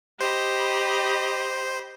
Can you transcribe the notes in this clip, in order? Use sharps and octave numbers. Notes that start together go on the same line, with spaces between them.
G4 C5 D#5 B5